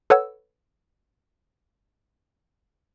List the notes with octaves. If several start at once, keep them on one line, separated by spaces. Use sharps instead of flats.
A4 B4 C#5 F#5 E6 G#6